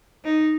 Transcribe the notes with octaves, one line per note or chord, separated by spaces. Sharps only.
D#4